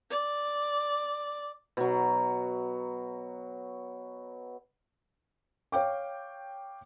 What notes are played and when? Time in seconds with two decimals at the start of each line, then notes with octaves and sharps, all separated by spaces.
0.10 D5
1.77 B2 F#3
5.72 C#5 F5 G5 D6